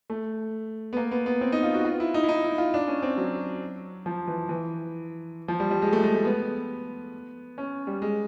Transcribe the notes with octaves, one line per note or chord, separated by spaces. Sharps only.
A3
B3
A#3
B3
B3
C4
D#4
F4
F#4
F4
E4
D#4
E4
D#4
E4
F4
D4
C#4
C4
F#3
F3
E3
E3
F3
G3
G3
G#3
A3
G#3
A3
B3
C#4
G3
G#3